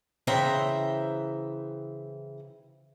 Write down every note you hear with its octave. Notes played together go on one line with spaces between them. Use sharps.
C#3 E3 C5 E5 G5 A#5